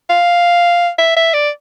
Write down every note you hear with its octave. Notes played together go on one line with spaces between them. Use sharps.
F5
E5
E5
D5